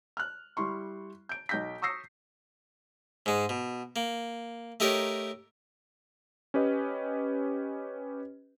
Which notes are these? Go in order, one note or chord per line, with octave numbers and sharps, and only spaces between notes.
F6 F#6
G3 E4 C6 C#6
G6 D7
B1 D#4 G6 A#6 B6
C#6 D#6 E6 A#6 C7 C#7
G#2 G#3
B2
A#3
A3 D#4 G4 A#4 C#5
C#4 G4 B4 D#5